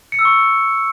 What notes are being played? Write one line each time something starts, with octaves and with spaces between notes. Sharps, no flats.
C#7
E6
C#6